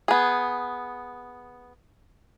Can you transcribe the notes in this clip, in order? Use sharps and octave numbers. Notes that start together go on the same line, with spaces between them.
B3 G#4